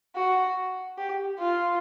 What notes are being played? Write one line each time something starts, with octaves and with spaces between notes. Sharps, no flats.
F#4
G4
F4